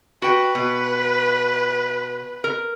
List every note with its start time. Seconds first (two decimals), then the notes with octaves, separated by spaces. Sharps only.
0.22 F#4 B4 G5
0.55 B2
2.44 A#4